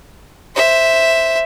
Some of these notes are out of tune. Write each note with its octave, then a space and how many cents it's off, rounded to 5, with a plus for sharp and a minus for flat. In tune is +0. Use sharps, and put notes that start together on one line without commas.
C5 +0 E5 +0